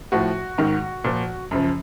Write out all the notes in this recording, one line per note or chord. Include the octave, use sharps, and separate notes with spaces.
A2 F3 F#4
G#2 D#3
A#2 F3
F#2 C#3 F3